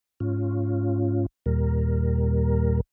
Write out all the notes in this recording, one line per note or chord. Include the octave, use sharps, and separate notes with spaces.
G#2 C#4 F4
D#2 A#2 G3 A#4